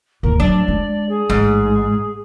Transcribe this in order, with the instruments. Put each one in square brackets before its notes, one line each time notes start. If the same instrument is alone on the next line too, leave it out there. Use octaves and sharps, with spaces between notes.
[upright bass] A1 D#2 [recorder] A#4
[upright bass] F#3 [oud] D4 [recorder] D5
[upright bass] G#3
[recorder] G#4
[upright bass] A1 [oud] G#2